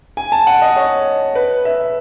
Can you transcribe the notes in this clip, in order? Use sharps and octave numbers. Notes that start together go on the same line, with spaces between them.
G#5
A5
F#5
D#5
C#5
B4
E5